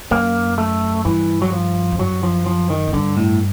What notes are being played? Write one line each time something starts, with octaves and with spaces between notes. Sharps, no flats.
F#2 A#3
A3
G2 E3
F#3
F3
F2
F#2 F#3
F3
F3
D#3
G#2
G2 D3
A2